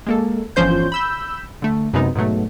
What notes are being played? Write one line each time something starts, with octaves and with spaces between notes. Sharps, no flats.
G#3 A#3 A4
G1 E3 F3 C#4 C5 G6
B5 E6 G6
D3 A3
F#2 C3 G#3 B3 D#4
G#2 B2 F#3 A3